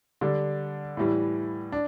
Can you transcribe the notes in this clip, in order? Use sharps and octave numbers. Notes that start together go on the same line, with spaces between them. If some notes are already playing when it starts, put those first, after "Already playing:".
D3 G3 D4
A2 E3 G3
D4